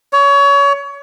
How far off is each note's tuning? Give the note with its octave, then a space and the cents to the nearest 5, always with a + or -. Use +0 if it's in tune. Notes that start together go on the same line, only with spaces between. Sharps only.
C#5 +25